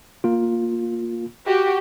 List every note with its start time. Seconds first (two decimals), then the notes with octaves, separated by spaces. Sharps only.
0.24 A#3 F4
1.46 F#4 G4